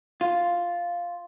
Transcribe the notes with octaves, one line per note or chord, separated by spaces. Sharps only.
F4